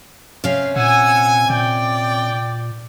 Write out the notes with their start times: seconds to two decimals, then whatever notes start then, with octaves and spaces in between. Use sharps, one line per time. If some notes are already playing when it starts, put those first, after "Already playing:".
0.44 C3 C#4 F5
0.76 A#2 F#5 G#5 E6
1.50 A#2 D5 G5